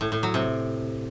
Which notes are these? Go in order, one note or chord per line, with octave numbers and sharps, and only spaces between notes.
A2
A2
F#3
C3